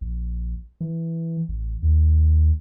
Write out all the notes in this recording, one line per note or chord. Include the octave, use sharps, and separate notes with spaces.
A#1
E3
A1
D#2